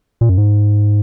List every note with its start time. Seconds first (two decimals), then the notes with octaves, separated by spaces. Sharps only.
0.21 A#2
0.29 F#2
0.38 G#2